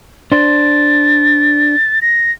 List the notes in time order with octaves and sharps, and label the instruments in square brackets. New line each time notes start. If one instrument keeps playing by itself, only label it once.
[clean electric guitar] D4 C5 [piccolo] A6
[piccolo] A#6